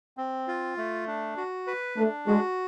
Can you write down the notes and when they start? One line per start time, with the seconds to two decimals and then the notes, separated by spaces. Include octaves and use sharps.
0.17 C4
0.48 F4
0.77 A3
1.07 D4
1.37 F#4
1.67 B4
1.97 A3 D4
2.27 G#3 F#4